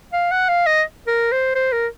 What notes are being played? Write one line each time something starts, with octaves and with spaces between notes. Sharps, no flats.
F5
F#5
F5
D#5
A#4
C5
C5
A#4